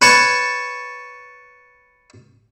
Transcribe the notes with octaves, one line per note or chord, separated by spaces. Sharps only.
B4 C#5 A5 C#6